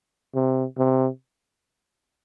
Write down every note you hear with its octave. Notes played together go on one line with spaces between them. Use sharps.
C3
C3